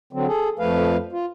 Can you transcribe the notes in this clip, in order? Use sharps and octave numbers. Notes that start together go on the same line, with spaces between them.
D3 F#3 C4
G#4 A4
F2 F3 A3 B4 F5
F4